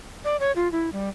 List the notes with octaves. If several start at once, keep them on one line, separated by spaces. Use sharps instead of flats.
D5
C#5
F4
E4
G3